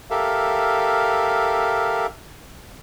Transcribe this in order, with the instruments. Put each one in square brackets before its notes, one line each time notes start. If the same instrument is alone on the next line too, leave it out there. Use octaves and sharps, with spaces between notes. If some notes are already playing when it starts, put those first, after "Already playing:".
[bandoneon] G4 A4 A#4 E5 F5